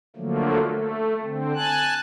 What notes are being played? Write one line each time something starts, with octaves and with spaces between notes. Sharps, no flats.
D3 F3 F#3 A3 A#3
A3
D3 C4
G#5 A5 F#6